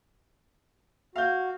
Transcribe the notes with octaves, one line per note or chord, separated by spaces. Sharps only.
F#4 F5 G6